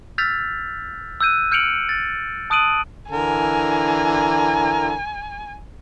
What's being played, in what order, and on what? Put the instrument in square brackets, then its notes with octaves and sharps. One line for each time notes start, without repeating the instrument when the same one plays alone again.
[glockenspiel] E6 F6 G6 A6 B6 F7
E6 F#6 G6 D#7
F6 G6 C#7 D7 F7 F#7
A6
A5 D#6 F#6 D7 D#7 F#7
[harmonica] D3 E3 A#4 [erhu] G#5